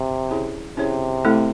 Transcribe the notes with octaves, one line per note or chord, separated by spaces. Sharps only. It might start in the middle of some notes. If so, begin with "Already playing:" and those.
Already playing: C3
C#4 E4 G#4 C#5
C3 C#4 E4 G#4 C#5
A3 C4 E4 A4